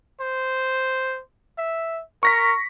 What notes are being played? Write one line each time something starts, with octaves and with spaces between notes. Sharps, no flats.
C5
E5
A#4 C#6 A#6 B6